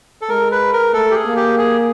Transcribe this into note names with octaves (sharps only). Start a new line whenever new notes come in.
A4
G#3 A#4
B4
A#4
A3 A4
G4
G#4
A#3
G4
G#4